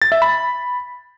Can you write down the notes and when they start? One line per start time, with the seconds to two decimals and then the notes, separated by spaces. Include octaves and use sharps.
0.02 A6
0.12 E5
0.22 B5